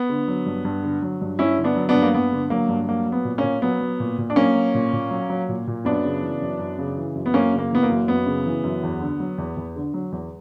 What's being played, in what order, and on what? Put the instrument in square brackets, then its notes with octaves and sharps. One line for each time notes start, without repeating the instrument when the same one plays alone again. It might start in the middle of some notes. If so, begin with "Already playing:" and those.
Already playing: [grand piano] B3
D3
F#3
G2
G2
D3
F#3
G2
G2 C#4 E4
D3
B3 D4
F#3
B3 D4
G2
A#3
G2 B3
D3
F#3 A#3
G2
F#3 A#3
F#3
B3
A#2
A#3 C#4
A#2
F#3 B3
F#3
A#2
A#2
D4
F#3 A#3 C#4
F#3
A#2
A#2
F#3
F#3
A#2
A#2
F#2 B3 D4
C#3
E3
F#2
F#2
C#3
E3
F#2
B3
F#2 A#3 C#4
C#3
A#3
E3 B3
A#3
F#2
F#2 B3
C#3
E3
F#2
E2
D3
F#3
E2
E2
D3
F#3
E2